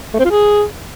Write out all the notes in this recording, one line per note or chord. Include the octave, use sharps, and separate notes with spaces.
A3
C4
F4
G#4